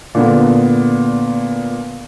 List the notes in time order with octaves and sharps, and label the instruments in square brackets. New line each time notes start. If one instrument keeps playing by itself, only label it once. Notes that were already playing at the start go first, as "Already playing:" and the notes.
[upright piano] A#2 D3 B3